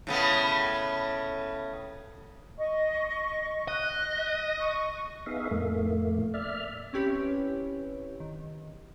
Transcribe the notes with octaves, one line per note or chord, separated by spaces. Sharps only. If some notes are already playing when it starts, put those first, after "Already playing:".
A2 C#3 B3
D#5 C#6
D#5 F#6
C#6
B3 D#4 G#4 E5 F5
F2 A2 A3 A#3
D5 E5 F6
C4 C#4 E4 G4 B4 C#5
D#3